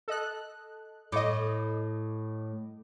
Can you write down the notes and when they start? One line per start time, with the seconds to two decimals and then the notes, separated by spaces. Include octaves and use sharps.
0.08 A4 D#5 F#6
1.12 A2 D#5 D6